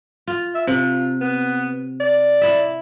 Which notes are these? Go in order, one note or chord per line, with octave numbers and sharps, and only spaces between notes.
F4
E5
C3 F4
B3
D5
E4 E5